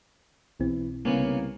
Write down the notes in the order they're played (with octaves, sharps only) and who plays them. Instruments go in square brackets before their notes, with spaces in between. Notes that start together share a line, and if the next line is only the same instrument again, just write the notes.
[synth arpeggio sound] B1 B2 C4 [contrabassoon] E3
[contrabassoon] C2 [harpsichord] C#3 B3 C#4 [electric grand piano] A#3